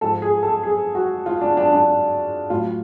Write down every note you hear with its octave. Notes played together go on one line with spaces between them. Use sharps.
G#2 F3 A4
G#4
A4
G#4
F#4
F4
D4
D4
D4
A2 F#3 F4